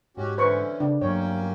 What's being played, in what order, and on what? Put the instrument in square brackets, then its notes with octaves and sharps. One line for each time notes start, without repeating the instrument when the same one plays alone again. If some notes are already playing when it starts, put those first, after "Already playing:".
[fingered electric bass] G#2 [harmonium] C#4 F#4 G4
[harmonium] D3 E3 C#4 [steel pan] B4 C5 C#6
[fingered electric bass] C#3 [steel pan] D4
[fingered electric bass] G2 F#3 B3 [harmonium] A#3 C#4 G5 [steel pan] C#5